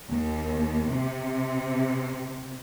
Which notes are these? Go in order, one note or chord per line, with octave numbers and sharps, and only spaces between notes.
D#2
C3